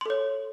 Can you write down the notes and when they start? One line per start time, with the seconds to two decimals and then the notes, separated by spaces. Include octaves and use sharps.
0.01 C6
0.06 A4
0.10 C#5